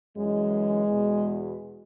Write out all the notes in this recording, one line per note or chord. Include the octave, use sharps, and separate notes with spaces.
F#2 E3 G#3
E2 B2